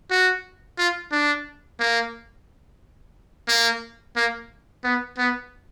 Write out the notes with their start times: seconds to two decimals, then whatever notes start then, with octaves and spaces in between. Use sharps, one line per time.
0.11 F#4
0.78 F4
1.12 D4
1.80 A#3
3.48 A#3
4.16 A#3
4.84 B3
5.18 B3